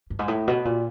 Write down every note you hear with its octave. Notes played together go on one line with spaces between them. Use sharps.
G2
G#2
A2
B2
A#2